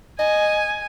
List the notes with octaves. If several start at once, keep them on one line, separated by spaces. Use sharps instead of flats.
D#5 G#5